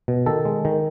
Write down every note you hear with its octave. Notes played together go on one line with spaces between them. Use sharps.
B2
D#3 A4
G#3
D#3